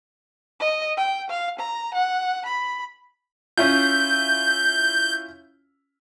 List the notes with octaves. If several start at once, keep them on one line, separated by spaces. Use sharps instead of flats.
D#5
G5
F5
A#5
F#5
B5
C#4 E4 F4 G6